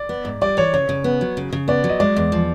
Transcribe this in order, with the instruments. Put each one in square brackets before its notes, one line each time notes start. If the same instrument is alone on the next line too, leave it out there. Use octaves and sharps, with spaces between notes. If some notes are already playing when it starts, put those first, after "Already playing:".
Already playing: [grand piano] D5
[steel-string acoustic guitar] B3
G#2
[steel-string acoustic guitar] G3 [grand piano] D5
[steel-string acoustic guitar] E3 [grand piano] C#5
[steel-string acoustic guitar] C#3 [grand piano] C#5
[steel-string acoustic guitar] C#3
B3
F#3
C#3
C#3
[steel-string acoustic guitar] B3 [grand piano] D5
[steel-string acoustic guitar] F#3
[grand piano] D#5
[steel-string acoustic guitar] G#3 [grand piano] D5
[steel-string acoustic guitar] E2
F3